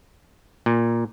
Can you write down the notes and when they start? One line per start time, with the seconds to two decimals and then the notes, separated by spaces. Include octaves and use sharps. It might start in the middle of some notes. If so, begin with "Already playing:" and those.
0.66 A#2